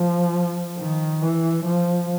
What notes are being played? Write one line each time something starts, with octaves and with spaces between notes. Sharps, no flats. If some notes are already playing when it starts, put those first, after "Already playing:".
Already playing: F3
D#3
E3
F3